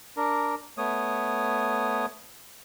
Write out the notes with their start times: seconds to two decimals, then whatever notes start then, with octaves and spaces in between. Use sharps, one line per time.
0.17 D4 A#4
0.78 A3 B3 C#5 D#6